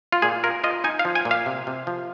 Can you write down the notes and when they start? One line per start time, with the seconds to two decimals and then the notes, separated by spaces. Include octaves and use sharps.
0.12 F4
0.22 A#2 G#4
0.44 F4 A#4
0.64 F4 D#5
0.84 D#4 G#5
0.99 F5
1.05 F3
1.15 G#5
1.25 A#2
1.31 F5
1.46 C3
1.67 C3
1.87 F3